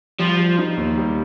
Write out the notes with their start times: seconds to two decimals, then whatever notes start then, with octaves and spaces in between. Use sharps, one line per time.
0.19 F3 G3
0.38 G3
0.59 D#4
0.77 D#2
0.97 G3